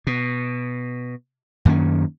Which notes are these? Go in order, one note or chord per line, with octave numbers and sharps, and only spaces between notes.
B2
F#2 D#3 A#3 C#4